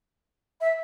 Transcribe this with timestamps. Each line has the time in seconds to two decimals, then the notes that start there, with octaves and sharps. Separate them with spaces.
0.61 E5